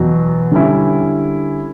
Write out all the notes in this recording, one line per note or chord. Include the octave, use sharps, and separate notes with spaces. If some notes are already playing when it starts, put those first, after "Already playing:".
Already playing: E2 B2 F#3
D3 G3 C#4 E4